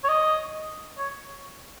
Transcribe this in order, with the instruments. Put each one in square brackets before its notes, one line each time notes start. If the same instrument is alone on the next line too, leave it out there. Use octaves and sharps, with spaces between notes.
[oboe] C#5
D#5
C#5